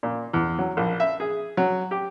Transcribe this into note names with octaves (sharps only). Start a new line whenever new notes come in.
A#2
E2
F#3
A#1
E5
G#4
F#3
G4